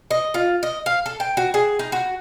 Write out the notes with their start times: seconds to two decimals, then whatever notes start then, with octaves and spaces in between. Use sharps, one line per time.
0.11 D#5
0.34 F4
0.63 D#5
0.86 F5
1.06 A4
1.20 G5
1.37 F#4
1.54 G#4
1.79 D#4
1.92 F#4